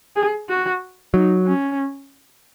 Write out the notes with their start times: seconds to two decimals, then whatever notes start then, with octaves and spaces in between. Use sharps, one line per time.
0.16 G#4
0.49 F#4
1.14 F#3 D#4
1.46 C#4